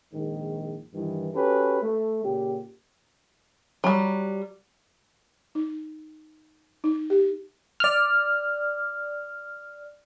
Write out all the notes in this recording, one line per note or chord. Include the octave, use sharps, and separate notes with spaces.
A#1 G#2 D#3
G2 D#3 E3
C#4 F#4 G4 A4 B4
A3
A#2 C#3 G4
F#3 G3
D#4
D#4
G4
D5 F6